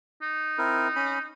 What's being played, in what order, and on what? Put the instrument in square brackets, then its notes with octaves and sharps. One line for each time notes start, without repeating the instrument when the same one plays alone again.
[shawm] D#4
[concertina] C4 E4 A#4
C#4 B5